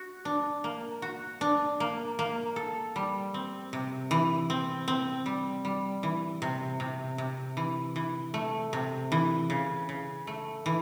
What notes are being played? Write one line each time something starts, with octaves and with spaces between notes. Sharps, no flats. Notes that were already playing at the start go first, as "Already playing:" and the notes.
Already playing: F#4
D4
A#3
F#4
D4
A#3
A#3
A4
G3
C4
C3
E3
C4
C4
G3
G3
E3
C3
C3
C3
E3
E3
A3
C3
E3
C#3
C#3
A3
E3